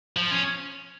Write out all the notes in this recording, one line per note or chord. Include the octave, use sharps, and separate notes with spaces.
F3
C#4